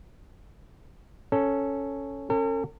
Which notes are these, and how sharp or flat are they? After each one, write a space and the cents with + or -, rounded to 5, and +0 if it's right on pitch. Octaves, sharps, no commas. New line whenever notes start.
C#4 +0 A4 +0
C#4 -25 A4 +45